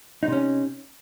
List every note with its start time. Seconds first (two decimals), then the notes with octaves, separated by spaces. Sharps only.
0.23 D#4
0.28 C3
0.32 C#4